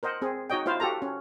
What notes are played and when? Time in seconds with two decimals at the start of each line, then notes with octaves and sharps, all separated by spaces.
0.03 A#4 C5 D#5 F#5
0.22 C4 G#4
0.50 D#4 F#4 C#5 D#5 G5
0.66 E4 F4 C5 F5
0.80 F#4 G4 A4 A#5
1.02 C#4